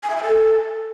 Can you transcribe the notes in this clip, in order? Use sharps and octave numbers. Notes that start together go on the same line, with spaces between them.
G#5
E5
G#5
A4